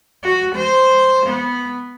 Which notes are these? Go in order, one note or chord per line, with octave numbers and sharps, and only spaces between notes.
F#4
C5
B3